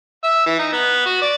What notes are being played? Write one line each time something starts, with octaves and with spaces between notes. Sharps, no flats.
E5
E3
D#4
B3
F#4
D5